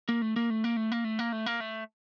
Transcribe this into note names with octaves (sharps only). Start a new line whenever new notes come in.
A#3
A3
A#3
A3
A#3
A3
A#3
A3
A#3
A3
A#3
A3